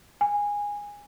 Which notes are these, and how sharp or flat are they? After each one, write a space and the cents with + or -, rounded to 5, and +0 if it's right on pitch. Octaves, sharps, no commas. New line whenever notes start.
G#5 -15